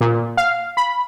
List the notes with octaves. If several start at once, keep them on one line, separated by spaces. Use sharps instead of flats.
A#2
F5
B5